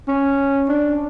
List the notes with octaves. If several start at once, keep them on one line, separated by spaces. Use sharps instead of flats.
C#4
D4